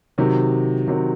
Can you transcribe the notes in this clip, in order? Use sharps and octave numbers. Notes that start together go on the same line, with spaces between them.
C3 D#3 F#3
C3 D#3 F#3